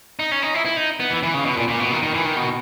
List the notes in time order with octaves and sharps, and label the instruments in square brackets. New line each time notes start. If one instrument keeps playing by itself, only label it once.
[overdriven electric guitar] D#4
C#4
D#4
E4
E4
D#4
B3
E3
E3
C#3
B2
A#2
A#2
B2
D#3
D#3
E3
D#3
B2